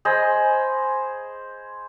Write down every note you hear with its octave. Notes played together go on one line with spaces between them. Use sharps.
G#4 C5 D#5 B5